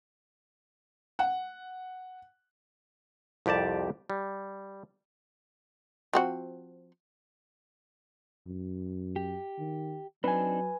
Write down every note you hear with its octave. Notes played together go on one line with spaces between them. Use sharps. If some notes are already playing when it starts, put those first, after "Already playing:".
F#5
C2 F2 G4 D5 A5
G3
F3 C4 F#4
F#2
G4
D#3
F#3 C4 D4 D#4 B4 G#5